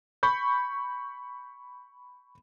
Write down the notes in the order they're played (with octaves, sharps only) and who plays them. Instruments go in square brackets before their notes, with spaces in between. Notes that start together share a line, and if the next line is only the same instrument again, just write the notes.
[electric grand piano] B5 C#6 G6